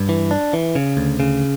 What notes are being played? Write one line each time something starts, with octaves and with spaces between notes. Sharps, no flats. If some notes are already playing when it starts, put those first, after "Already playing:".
Already playing: G2
E3
D4
E3
C#3
D2
C#3